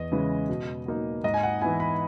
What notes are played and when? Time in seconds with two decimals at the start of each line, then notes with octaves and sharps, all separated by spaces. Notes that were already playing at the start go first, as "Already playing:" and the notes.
Already playing: E2 D#5
0.12 C#3 E3 G#3
0.49 B2
0.86 F#3 A#3 D#4
1.24 G#2 D#5
1.34 G#5
1.43 F#5
1.61 E3 B3 E4 G#5
1.80 B5